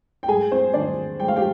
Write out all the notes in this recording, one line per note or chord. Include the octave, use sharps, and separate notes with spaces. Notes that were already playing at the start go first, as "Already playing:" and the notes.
G5
G#2 G#4 G#5
C4 C5
D#3 D4 D5
G#2 G5
F5
G4 G5